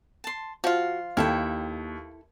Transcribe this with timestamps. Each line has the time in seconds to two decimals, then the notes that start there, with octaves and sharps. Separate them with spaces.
0.24 A5 C6
0.64 F3 F4 F#4
1.17 D#2 E4 A4 G5